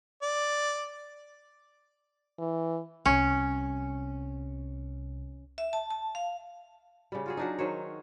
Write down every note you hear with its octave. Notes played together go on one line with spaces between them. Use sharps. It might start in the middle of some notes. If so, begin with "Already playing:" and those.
D5
E3
C2 C3 C#4
E5
A5
A5
F5
C#3 G3
F4 F#4 G#4
F#3 D4 D#4
D#3 F#3 C5 C#5